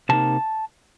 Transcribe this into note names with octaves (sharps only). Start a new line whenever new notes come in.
C3 F3 A#3 D#4 A5